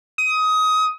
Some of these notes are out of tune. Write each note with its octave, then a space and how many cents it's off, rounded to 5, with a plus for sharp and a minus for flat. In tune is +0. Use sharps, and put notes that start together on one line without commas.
D#6 +20